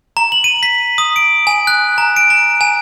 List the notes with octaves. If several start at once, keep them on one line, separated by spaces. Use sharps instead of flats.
A#5
F#7
D#7
B6
D#6
D7
G#5
F#6
A#5
D7
A#5
G#5